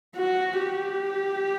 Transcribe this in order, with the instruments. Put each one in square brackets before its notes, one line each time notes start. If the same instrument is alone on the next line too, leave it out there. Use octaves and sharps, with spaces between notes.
[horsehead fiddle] F#4
G4